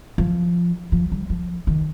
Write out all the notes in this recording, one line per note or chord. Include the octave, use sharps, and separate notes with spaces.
F3
F3
G3
F3
D#3